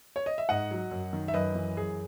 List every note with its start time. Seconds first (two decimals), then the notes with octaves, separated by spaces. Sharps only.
0.16 C#5
0.26 D#5
0.38 E5
0.49 G#2 D#5 F#5
0.71 F#3
0.91 F#2
1.13 D#3
1.28 E5
1.34 F#2 B4 D#5
1.55 E3
1.76 F#2 G#4